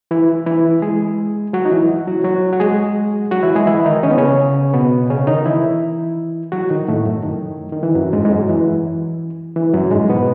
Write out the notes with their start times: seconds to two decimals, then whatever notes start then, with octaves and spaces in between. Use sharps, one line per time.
0.11 E3 E4
0.46 E3 E4
0.82 G#3 G#4
1.53 F#3 F#4
1.65 D#4
1.71 E3 E4
2.07 F#3 F#4
2.24 F#3 F#4
2.53 F#4
2.60 G#3 G#4
3.31 F#3 F#4
3.43 E3 E4
3.56 G#3 G#4
3.67 E3 E4
3.86 D#3 D#4
4.03 C#4
4.11 B3
4.18 C#3 C#4
4.74 B2 B3
5.10 C#3 C#4
5.27 D#3 D#4
5.46 E3 E4
6.52 F#3 F#4
6.70 D#3 D#4
6.88 A2 A3
7.05 F#2 F#3
7.24 D#3
7.72 D#3
7.83 E3
7.95 F#2 F#3
8.13 G#2 G#3
8.25 G#3
8.30 F#2 F#3
8.49 E3
9.56 E3
9.74 F#2 F#3
9.91 G#2 G#3
10.09 B2 B3